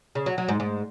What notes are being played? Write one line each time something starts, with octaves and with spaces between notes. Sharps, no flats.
C#3
F#3
F#3
G#2
G#2